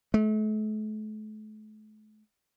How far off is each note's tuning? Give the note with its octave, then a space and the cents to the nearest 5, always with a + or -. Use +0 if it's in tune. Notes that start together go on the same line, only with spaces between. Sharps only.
A3 -40